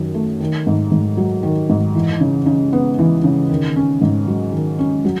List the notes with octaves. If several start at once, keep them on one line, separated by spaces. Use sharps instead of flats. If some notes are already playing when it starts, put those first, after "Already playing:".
Already playing: F#2 D#3 F#3
A3
D#3
G#2
G#2
F#3
D#3
G#2
E3
C#3
C#3
B3
E3
C#3
D#3
C#4
G#2
F#3
D#3
C#4
F#3